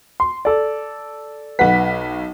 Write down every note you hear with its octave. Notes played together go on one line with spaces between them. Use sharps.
C6
A4 D5
B1 B4 F#5 B6